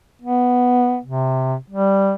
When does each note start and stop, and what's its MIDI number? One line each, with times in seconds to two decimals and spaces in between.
0.22 0.99 59
1.05 1.56 48
1.70 2.14 55